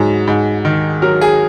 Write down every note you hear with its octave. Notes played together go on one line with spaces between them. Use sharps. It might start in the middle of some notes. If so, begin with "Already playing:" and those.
Already playing: G#2 F#3
G#2
D#3
F#3 A#4
G#4